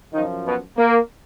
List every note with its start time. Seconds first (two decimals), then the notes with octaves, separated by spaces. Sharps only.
0.12 F#2 D#3 F3 D#4
0.45 B2 B3
0.78 A#3